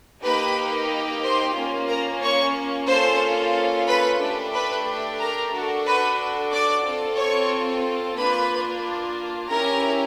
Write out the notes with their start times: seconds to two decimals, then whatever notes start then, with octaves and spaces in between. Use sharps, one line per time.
0.24 A#3 D#4 G4 B4 B5
1.22 C5 C6
1.56 A#3 C#4 F4
1.89 A#4 A#5
2.22 C#5 C#6
2.88 A#3 C#4 F4 A4 C5 C6
3.87 B4 B5
4.20 A3 D4 G4
4.54 B4 B5
5.20 A#4 A#5
5.54 D4 F#4 A4
5.86 B4 B5
6.52 D5 D6
6.85 C4 F4 A4
7.18 C#5 C#6
8.17 A#3 D4 F4 B4 B5
9.49 C#4 E4 G4 A#4 A#5